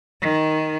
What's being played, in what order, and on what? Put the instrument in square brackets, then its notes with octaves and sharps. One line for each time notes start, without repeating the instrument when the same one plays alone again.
[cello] D#3